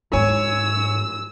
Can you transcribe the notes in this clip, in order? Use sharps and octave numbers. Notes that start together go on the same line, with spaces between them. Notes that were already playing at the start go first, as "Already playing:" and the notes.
G#2 C#5 G#5 E6